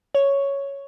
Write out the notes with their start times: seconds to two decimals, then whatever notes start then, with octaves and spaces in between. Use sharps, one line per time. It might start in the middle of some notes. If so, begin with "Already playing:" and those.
0.15 C#5